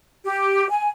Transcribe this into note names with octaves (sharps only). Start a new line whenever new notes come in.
G4
G#5